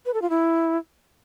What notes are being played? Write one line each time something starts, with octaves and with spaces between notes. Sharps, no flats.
B4
A4
F4
E4